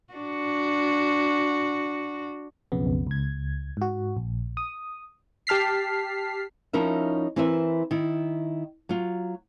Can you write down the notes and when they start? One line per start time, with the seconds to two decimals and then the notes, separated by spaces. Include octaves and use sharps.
0.14 D4 F#4
2.72 B1 F2 C#3 B3
3.07 C#2 G#6
3.77 G#2 F#4
4.17 A#1
4.57 D#6
5.47 G4 A5 F6 B6 C7
6.73 F3 C#4 D#4 E4 A#4 E5
7.36 E3 C4 E4 A#4 B4 E5
7.91 D#3 E4
8.89 F#3 F4